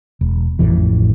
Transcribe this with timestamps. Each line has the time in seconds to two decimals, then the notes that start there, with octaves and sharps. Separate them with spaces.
0.21 E1
0.59 A1 F2 A2 E3